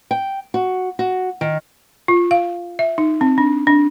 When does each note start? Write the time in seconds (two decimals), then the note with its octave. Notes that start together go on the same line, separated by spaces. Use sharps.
0.11 G5
0.54 F#4
0.99 F#4
1.41 D#3
2.08 F4
2.31 F5
2.79 E5
2.98 D#4
3.21 C4
3.38 D4
3.67 D4